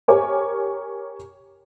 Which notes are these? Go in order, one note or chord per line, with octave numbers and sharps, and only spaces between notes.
G4 A#4 C#5 G#5 D6